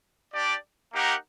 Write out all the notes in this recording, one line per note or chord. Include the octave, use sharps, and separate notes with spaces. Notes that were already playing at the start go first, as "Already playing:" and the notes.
D4 G4 D5
A#3 D#4 G4 A#4 F#5